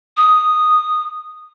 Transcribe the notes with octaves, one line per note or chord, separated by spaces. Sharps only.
D#6